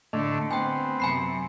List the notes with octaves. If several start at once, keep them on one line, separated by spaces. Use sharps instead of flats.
A2 D3 A3 D4 D#5
D2 B3 C4 G5 G#5
F#2 C3 G#5 B5 C7